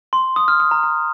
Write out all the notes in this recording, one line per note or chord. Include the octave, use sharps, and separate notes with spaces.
C6
D#6
F6
D#6
A#5
A#5